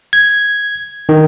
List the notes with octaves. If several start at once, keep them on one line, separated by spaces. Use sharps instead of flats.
G#6
D#3